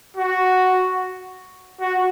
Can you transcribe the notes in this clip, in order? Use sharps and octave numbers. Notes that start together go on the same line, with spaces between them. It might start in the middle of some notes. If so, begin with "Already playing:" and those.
F#4
F#4